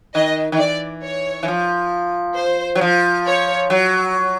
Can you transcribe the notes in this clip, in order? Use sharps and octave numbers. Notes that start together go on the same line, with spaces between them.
D#3 D#5
D#3
E3 D5
C#5
E3
F3
C5
F#3
F3
C#5
F#3